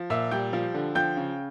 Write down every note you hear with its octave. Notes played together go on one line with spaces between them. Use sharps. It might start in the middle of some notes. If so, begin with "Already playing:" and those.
Already playing: F3
A#2 E5 E6
G3 G5 G6
F3
D3
F3 G5 G6
C#3